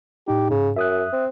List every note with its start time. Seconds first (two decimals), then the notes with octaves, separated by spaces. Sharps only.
0.28 A2 D#4 G4
0.50 G#2 C#3
0.76 F#2 E5 D#6 F#6
1.13 C4